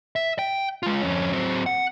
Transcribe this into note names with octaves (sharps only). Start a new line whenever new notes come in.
E5
G5
G#3 F4
F2 C#4
F#3 C4
F#5